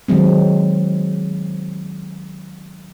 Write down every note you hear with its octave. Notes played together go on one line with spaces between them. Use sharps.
D#3 F#3 G#3 C4